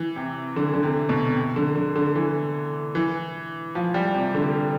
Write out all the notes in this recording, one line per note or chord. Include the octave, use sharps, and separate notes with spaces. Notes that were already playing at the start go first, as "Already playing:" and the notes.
Already playing: E3
C3
D3
D3
C3
B2
C3
D3
D3
D3
E3
E3
F3
G3
C3
D3